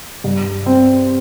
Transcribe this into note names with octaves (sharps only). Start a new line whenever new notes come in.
G2
C4